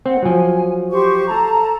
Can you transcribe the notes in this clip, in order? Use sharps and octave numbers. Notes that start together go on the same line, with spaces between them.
C4 F#5
F3 F#3 G#5
G4 C5 C#6
A4 A5 A#5